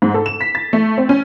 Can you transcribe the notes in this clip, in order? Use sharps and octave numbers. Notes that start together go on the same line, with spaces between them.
G#2
A4
E7
B6
A6
A3
C4
C#4